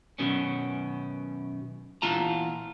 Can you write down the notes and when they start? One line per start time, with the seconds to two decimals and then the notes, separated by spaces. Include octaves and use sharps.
0.19 F#2 B2 D#3 C#4
2.02 E2 A#2 E3 F4 A5 A#5